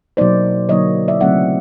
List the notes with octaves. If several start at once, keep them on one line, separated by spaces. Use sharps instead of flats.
B2 F#3 A#3 D#4 C5 D5
D3 F#3 A#3 D#4 C#5 D#5
D5 E5
C#3 F#3 A3 C4 E4 E5 F#5